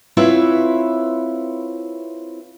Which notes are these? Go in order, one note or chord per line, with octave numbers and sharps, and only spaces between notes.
C4 E4 F4 B4 C#5 E5